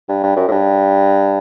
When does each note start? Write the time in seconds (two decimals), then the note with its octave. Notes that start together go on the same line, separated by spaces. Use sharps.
0.09 G2
0.24 G2
0.37 F#2
0.48 A2
0.51 G2